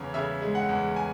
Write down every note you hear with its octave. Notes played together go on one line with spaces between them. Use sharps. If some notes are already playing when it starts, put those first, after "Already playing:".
Already playing: E2 C#3 E3 C#5
C#3 E5
G#3
F#5
E2
G#5